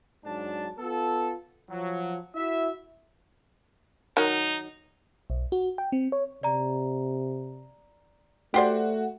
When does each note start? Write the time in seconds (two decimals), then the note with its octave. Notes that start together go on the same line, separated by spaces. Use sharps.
0.25 G#2 F#3 D4 A5
0.79 B3 F4 A4
1.70 F3 F#3
2.35 E4 F#4 E5
4.17 D#3 F#3 D#4
5.30 B1
5.52 F#4
5.78 G5
5.92 C4
6.12 C#5
6.43 C3 D5 A#5
8.54 A3 F#4 G4 C5 D5